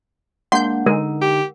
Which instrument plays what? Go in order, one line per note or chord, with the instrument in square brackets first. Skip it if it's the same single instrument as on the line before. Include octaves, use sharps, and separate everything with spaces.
[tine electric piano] G#3 A#3 D4 [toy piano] F#5 [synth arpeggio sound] C6 G6
[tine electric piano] D3 D#4 [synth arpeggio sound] G#3 [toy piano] A#4
[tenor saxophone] G4